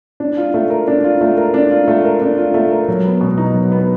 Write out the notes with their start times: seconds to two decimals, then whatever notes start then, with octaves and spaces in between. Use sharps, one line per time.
0.20 D4
0.37 F4
0.54 A3
0.70 A#4
0.88 D4
1.04 F4
1.21 A3
1.37 A#4
1.54 D4
1.71 F4
1.88 A3
2.05 A#4
2.22 D4
2.38 F4
2.54 A3
2.71 A#4
2.88 F#3
3.05 B3
3.21 B2
3.38 D#4
3.54 F#3
3.72 B3